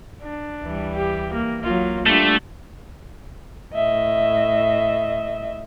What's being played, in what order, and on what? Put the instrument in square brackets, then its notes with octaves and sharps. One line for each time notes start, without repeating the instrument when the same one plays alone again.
[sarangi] D4
[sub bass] D2 [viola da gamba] E3 G3
[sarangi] G4
A#3
[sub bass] B1 [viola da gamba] F#3 F4 [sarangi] A#3
[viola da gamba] G3 D4 F4 [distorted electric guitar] A3
[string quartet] A2 D#5 E5